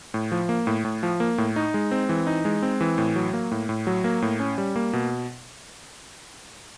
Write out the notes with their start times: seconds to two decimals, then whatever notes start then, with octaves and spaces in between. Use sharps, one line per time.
0.14 A2
0.32 F3
0.49 A#3
0.67 A2
0.85 A2
1.03 F3
1.20 A#3
1.38 A2
1.56 D#4
1.74 G#3
1.91 C4
2.09 E3
2.27 D#4
2.45 G#3
2.62 C4
2.81 E3
2.98 A2
3.16 F#3
3.33 A#3
3.51 A2
3.69 A2
3.87 F#3
4.04 A#3
4.22 A2
4.40 C#4
4.58 G3
4.76 A#3
4.93 B2